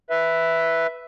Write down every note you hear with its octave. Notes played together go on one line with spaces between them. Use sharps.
B4 E5